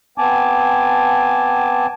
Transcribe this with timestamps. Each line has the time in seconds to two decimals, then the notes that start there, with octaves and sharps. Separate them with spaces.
0.18 B3 C4 G#5 A5 D6